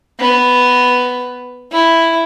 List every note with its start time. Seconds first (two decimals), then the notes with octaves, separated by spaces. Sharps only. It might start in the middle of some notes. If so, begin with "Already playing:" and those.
0.20 B3
1.72 E4